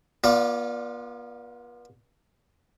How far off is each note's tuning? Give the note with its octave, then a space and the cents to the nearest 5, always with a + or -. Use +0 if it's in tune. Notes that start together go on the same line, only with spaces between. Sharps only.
B3 -40 F4 +0 D5 +0